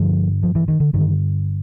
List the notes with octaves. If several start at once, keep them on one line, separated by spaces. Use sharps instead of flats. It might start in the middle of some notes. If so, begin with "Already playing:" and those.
Already playing: G2 D3 F3
F3
E3
D#3
D3
G2 D3 D#3